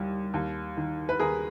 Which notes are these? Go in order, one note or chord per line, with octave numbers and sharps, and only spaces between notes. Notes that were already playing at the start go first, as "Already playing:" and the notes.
Already playing: D#2 G3
D#2
D#3
B4
D#2 G#4 A#4